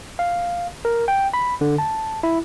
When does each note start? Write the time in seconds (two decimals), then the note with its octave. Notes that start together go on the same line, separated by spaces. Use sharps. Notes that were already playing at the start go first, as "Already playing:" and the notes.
0.19 F5
0.85 A#4
1.08 G5
1.34 B5
1.61 D3
1.78 A5
2.23 E4